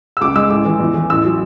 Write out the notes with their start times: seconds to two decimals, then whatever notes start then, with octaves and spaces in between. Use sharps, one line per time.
0.17 E6
0.21 C#2 D6
0.35 G#3 E6
0.50 A1 D6
0.65 E3
0.80 E2
0.94 E3
1.10 A1 E6
1.25 F#3